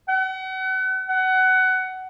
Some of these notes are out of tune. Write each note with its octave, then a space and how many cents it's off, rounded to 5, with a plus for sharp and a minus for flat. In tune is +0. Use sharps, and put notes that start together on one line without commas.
F#5 +35
F#5 +20